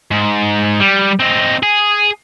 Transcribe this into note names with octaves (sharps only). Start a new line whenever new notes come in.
G#2
G3
C4 D#4
G#4